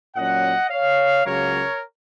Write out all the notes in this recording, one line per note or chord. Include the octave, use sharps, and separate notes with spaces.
A#2 F#3 C#4 D#5 F#5
C#5 F5
C#2 C#3 F#3 A#3 A#4 C#5